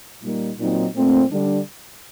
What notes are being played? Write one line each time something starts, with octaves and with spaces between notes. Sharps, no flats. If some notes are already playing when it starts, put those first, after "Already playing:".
A#2 G3 A#3 D#4
A#2 F#3 C4 D#4
A#2 A3 C4
D3 G3 D4